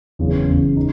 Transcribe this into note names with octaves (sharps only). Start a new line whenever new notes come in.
F#1 E2 C#3
F#1 E2 C#3
D#4